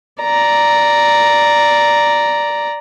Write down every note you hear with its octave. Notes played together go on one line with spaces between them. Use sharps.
D5 A#5